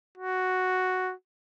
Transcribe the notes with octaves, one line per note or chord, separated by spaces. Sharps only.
F#4